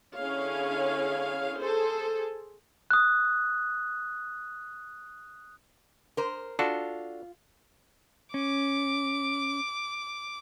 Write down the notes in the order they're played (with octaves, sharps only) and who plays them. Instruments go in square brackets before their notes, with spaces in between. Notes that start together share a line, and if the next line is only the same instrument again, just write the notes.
[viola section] D3 C#4 E4 G#4 C#5 F5
G#4 A4 C5
[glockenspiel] D#6 F#6
[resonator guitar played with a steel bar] A#4 C5
[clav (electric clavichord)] D4 F#4 A4 [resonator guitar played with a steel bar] F4
[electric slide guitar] C#4 [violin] D6